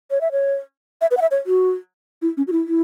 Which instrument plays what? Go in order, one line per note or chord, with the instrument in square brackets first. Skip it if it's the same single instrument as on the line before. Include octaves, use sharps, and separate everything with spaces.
[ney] C#5
E5
C#5
E5
B4
F#5
E5
C#5
F#4
E4
C#4
F#4
E4
E4